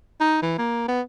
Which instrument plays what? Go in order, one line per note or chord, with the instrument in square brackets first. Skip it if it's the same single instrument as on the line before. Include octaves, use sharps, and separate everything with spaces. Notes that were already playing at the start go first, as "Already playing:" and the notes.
[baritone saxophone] D#4
E3
A#3
B3